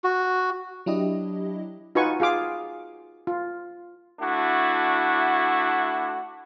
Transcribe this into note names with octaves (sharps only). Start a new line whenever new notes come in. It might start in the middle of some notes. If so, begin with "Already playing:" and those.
F#4
F#3 D4 E4 G4 D#5
D#4 F4 F#4 B4 G#5 C#6
F4 G#4 F5 D6
F4
A3 D4 E4 F#4